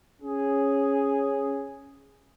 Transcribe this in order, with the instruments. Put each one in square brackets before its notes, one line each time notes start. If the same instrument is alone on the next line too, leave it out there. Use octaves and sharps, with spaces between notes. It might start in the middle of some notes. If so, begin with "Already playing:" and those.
[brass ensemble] C#4 G#4